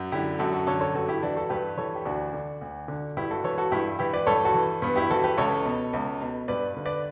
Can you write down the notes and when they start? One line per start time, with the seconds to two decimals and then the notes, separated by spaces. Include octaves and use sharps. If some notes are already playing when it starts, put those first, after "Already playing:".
Already playing: F#2
0.12 D3 E4 G4
0.39 F#2 F#4 A4
0.53 F#4 A4
0.67 D3 A4 C#5
0.81 A4 C#5
0.94 G2 F#4 A4
1.08 E4 G4
1.22 E3 D4 F#4
1.36 F#4 A4
1.50 G2 G4 B4
1.77 E3 A4 C#5
1.95 G4
2.05 D2 D4 F#4
2.33 D3
2.61 D2
2.88 D3
3.17 G2 E4 G4
3.31 F#4 A4
3.44 E3 A4 C#5
3.58 F#4 A4
3.71 G2 E4 G4
3.99 E3 E4 G4
4.13 B4 D5
4.27 G2 A4 C#5
4.45 F#4 A4
4.54 E3
4.82 G2 B3
4.96 E4 G4
5.10 E3 F#4 A4
5.24 G4 B4
5.38 C#2 A4 C#5
5.65 B2
5.93 C#2
6.22 B2
6.48 G2 B4 D5
6.77 D3
6.85 B4 D5